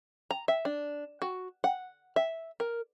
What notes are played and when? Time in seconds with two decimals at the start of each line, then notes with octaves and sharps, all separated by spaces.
0.31 A#5
0.48 E5
0.65 D4
1.22 F#4
1.64 F#5
2.16 E5
2.60 A#4